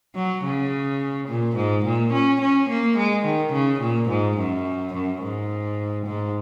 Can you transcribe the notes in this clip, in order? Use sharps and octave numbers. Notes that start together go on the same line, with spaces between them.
F#3
C#3
A#2
G#2
A#2
C#4
C#4
A#3
G#3
D#3
C#3
A#2
G#2
F#2
F#2
G#2
G#2